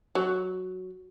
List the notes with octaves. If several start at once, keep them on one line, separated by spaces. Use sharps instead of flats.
F#3